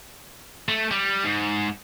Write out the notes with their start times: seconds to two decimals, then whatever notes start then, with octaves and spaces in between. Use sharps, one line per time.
0.69 A3
0.91 G3
1.24 G#2